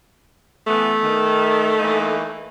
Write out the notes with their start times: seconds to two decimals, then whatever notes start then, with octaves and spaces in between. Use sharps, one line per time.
0.67 E3 A3 B3
1.02 D#3
1.79 E3 A#3 D#4